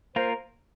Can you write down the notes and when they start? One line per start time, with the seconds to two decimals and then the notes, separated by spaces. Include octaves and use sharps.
0.16 A#3 F4 A#4 C5